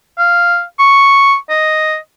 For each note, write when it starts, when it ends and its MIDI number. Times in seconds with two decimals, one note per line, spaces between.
0.18 0.62 77
0.79 1.36 85
1.50 1.96 75